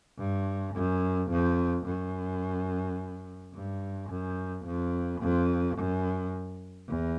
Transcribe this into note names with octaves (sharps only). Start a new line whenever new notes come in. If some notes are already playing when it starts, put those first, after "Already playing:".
G2
F#2
F2
F#2
G2
F#2
F2
F2
F#2
E2